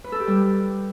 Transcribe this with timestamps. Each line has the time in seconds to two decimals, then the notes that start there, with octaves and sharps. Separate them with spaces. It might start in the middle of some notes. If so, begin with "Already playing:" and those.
0.04 B4
0.12 A4
0.20 G4
0.27 G3